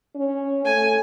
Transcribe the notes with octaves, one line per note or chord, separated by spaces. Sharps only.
C#4
A3 G#5